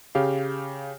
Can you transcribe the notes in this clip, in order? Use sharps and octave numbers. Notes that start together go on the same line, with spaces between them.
C#3 G4 F5